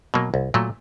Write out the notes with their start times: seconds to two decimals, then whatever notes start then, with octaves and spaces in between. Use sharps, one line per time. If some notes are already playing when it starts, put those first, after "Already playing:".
0.14 B2 F#3 A#3
0.34 C2
0.54 A#2 F#3 A3